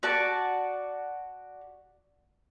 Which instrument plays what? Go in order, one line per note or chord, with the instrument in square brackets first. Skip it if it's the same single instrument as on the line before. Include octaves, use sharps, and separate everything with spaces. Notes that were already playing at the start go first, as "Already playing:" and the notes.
[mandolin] F#4 D5 A5